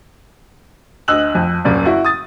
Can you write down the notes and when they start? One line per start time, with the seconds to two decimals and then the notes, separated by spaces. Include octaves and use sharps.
1.08 D2 D#5 E6 F#6 F#7
1.35 F2
1.65 D#1 F#2 C#3 D5
1.86 E4 F#4
2.05 D#6 A6